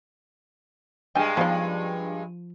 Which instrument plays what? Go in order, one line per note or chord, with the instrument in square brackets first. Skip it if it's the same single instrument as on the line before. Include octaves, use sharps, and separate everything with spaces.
[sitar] G2 G#3 [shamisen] G5 G#5
[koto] F3 [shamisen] B3 D#4